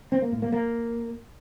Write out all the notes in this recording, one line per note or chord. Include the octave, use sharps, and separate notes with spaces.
C4
A#3
A2
A#3
A#3